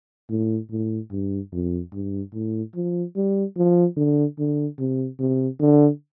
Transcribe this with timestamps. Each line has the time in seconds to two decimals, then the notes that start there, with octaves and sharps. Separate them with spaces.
0.30 A2
0.71 A2
1.11 G2
1.52 F2
1.93 G2
2.34 A2
2.75 F3
3.16 G3
3.57 F3
3.97 D3
4.38 D3
4.78 C3
5.19 C3
5.60 D3